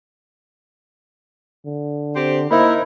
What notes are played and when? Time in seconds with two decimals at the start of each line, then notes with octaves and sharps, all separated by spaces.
1.66 D3
2.15 C4 G4 C5
2.51 A#3 D#4 E4 A#4 C5 D#5 B5